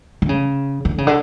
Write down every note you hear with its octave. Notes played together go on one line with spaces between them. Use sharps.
D3
C#3
D3
C#3
D3